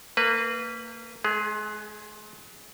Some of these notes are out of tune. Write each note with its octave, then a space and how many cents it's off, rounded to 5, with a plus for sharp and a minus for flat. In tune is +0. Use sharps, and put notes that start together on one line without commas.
A#3 -30 B4 +0
G#3 +35 G#4 -5